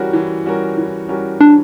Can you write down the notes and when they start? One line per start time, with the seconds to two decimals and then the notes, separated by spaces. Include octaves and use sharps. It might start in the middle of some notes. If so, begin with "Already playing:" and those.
Already playing: E3 G3 C#4 F#4 A#4
0.13 E3
0.46 G3 C#4 F#4 A#4
0.78 E3
1.08 G3 C#4 F#4 A#4
1.40 E3 D4